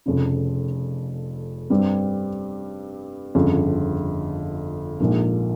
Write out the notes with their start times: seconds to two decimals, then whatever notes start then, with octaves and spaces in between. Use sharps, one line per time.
0.06 F1 F2 C#3
1.70 G2 G3 C4
3.35 G1 F2 C#3
5.00 A#1 G#2 F3 A#3